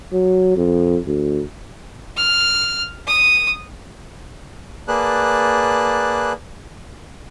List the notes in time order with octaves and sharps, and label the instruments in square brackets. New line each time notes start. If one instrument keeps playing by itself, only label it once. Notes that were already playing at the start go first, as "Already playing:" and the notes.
[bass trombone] F#3
F2
D2
[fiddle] F6
D#6
[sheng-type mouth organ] A#3 G#4 B4 D5 A5 F#6